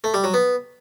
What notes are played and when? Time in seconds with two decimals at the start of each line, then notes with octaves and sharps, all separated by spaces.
0.04 A3
0.14 G3
0.24 F#3
0.34 B3